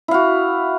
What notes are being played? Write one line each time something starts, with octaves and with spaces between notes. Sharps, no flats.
E4 F#4 F5